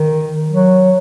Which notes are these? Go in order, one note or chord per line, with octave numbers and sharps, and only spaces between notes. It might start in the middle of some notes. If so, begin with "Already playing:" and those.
Already playing: D#3
F#3